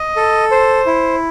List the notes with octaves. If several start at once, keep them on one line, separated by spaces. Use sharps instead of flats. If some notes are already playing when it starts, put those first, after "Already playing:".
Already playing: D#5
A4
C5
E4